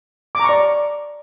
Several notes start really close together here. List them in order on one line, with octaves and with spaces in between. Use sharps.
D6 A#5 C#6 D5